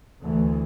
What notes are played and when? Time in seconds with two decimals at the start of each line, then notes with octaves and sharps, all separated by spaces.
0.23 D2 E3